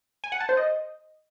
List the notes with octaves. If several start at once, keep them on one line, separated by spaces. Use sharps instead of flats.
G#5
F#5
A5
C5
D#5